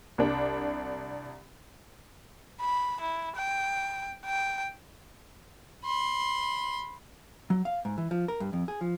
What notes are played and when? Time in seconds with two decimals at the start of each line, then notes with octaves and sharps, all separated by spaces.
0.18 C2 D4
2.60 B5
3.01 E4
3.36 G5
4.25 G5
5.84 B5 C6
7.50 F#3
7.65 F5
7.85 G#2
7.98 E3
8.11 F3
8.28 A#4
8.40 G2
8.53 F2
8.68 G#4
8.81 F3